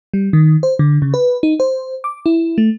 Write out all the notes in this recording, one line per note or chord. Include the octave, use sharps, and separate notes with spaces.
G3
D#3
C5
D3
C#3
B4
D#4
C5
D6
E4
A3